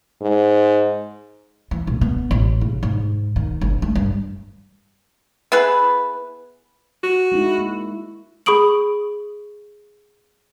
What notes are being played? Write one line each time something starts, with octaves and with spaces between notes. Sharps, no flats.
G#2
E3
A#1
B3
A1
C#3
G#2
D#3
G1
A3
G2
B3 E4 G#4 B4
F#4
G#3 D#4 E4
A#3
G#4 B5 C#6 D#6 D7 F#7